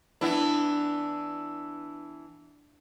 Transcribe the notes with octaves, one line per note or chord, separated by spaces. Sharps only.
E3 B3 D4 E4